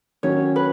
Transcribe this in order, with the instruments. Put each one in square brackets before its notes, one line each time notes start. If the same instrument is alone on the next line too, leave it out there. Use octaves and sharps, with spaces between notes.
[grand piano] D#3 F#3 C#4 [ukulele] C#5
[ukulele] B4